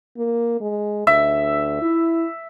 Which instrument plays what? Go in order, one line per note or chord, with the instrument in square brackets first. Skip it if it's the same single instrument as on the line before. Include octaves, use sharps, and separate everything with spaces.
[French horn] A#3
G#3
[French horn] D2 [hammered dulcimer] E5
[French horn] E4